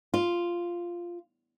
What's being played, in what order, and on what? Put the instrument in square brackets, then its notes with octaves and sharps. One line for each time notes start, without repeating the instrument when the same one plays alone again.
[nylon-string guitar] F4